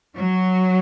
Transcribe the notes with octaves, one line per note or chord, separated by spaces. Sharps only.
F#3